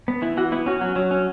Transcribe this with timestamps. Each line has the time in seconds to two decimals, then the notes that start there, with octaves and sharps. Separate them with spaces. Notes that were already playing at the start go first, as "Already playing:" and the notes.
0.08 B3
0.22 E3 E4
0.37 E3 F#4
0.52 B3 E4
0.66 C#4 F#4
0.81 F#3
0.96 F#3
1.11 C#4